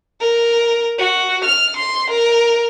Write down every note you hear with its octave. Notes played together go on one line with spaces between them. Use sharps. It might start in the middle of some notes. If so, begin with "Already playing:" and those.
A#4
F#4
F6
C6
A#4